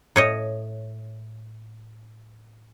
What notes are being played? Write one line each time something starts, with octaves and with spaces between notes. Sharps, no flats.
A2 C#5 D#5